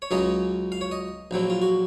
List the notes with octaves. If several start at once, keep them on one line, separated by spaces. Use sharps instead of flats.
C#5
C#2 C#3 F#3 C#4 D#5
F5
C#5
D#5
A#1 A#2 F#3 C4
F4
F#4